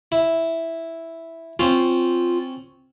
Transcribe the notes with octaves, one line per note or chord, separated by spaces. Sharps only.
E4
C4 C#4 F4